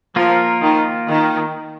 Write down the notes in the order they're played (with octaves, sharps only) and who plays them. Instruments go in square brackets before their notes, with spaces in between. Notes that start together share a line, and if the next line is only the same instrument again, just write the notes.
[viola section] F3 [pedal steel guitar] A#3 F4 A#4
[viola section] D#3
D#3